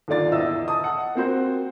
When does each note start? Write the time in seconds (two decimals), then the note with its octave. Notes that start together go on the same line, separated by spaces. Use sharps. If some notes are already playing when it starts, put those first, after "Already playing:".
0.08 D#2 D3 F4 D5 A6
0.32 E2 D#5 E5 E6
0.68 A5 D#6
0.84 F#5
1.15 A#3 C4 F#4 C5